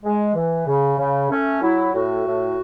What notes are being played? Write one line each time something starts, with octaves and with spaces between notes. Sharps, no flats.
G#3
E3
C#3
C#3
A3 C#4
F#3 E4
A2 F#4
A2